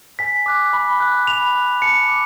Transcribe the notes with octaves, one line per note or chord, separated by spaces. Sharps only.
G#5 B6
D6 F#6
B5
F#6
B5 F7
F#6
A5 C#7
D6